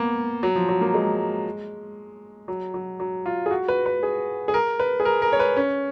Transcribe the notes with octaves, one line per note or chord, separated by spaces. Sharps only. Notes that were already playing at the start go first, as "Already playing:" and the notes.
Already playing: A#3 B3
F#3
F3
F#3
A#3
G#3
F#3
F#3
F#3
F4
G#4
F#4
B4
B4
G#4
G#4
A#4
B4
G#4
A#4
A#4
C#5
B4
C#4